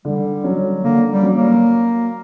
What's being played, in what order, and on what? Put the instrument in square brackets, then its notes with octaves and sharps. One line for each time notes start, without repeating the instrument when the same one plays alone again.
[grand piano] D3 [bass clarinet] G3
[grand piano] F#3 C#4
[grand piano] D3 [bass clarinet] A#3
[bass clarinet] G3
[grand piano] F#3 C#4
[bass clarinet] A#3